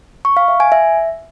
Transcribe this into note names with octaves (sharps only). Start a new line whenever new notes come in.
C#6
F5
E5
G#5
E5